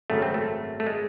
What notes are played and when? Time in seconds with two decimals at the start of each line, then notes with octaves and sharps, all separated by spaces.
0.10 G#1 F#2 C#3 A3
0.22 C4
0.34 A3
0.80 A3
0.86 G#3